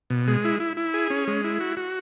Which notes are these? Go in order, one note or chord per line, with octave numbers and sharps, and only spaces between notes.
B2
G#3
E4
E4
E4
G#4
C#4
G#3
E4
F#4
F#4